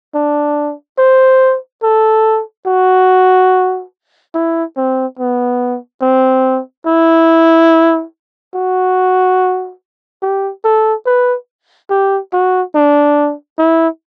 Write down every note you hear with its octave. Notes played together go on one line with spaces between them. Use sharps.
D4
C5
A4
F#4
E4
C4
B3
C4
E4
F#4
G4
A4
B4
G4
F#4
D4
E4